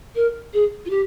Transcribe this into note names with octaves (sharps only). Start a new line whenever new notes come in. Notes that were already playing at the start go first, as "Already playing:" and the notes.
A#4
G#4
F4
G4